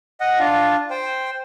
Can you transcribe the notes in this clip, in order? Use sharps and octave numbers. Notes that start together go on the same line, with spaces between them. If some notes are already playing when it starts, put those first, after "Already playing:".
D#5 F#5
D4 F4 F5
C5 G5